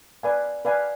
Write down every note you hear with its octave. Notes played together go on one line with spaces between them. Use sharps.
B4 D5 F5 G#5
B4 D5 F5 G#5